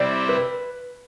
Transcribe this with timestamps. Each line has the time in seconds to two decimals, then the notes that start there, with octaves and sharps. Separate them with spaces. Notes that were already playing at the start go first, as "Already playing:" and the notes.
Already playing: C3 G3 C4 E4 D5
0.29 B4